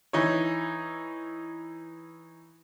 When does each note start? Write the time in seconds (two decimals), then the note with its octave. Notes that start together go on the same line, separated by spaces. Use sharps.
0.13 E3 D#4 C#5